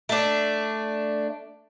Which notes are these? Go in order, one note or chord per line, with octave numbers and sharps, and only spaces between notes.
A3 D4